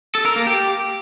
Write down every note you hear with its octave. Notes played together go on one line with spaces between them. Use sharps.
A4
A#4
A#3
G4